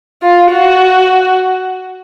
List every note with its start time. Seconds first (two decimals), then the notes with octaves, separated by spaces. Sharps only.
0.22 F4
0.52 F#4